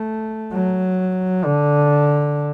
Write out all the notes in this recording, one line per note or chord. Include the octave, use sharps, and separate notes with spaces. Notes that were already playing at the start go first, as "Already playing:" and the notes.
Already playing: A3
F#3
D3